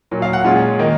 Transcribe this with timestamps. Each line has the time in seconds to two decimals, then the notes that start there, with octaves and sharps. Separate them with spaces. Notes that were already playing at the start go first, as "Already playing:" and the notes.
0.11 A#2 F#3 A#3
0.22 F5
0.33 F#5
0.44 A#2 G#3 C#4 F4
0.79 D#3 A#3 D#4